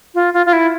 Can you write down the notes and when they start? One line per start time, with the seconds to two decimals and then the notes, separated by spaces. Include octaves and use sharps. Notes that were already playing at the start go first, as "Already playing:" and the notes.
0.15 F4
0.34 F4
0.46 F4
0.53 E4